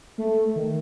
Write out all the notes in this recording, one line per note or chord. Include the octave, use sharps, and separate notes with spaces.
A3
D#3